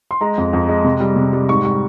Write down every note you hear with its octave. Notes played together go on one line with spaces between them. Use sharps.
C6
G#3 A#5
F2
F2
G#3
C3
G3
C3
G3
G#2 C#6
G3 C#6